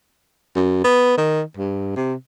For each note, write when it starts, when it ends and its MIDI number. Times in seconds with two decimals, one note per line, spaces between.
0.56 0.82 42
0.84 1.14 59
1.18 1.42 51
1.57 1.92 43
1.96 2.14 48